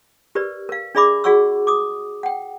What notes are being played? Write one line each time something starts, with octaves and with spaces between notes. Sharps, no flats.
G4 A#4 B4 D5
A#4 F5
D4 G#4 D5 E5 B5 D6
F#4 G#4 D5 F#5 C#6 E6
D6 D#6
F#5 G5